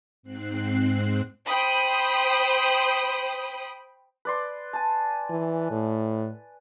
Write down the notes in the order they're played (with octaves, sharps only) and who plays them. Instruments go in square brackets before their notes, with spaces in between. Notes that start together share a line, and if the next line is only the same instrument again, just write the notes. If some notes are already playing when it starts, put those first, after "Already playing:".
[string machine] G#2 C4 F#6 C7
[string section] C5 G5 B5 D#6
[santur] B4 D5 C6
G#5 A5
[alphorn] E3
A2